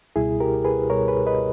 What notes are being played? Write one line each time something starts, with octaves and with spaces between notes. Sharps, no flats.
C#2 B2 G3 E4 G#4
G4 A#4
G#4 B4
C#2 B2 G3 A#4 C#5
G#4 B4
B4 D#5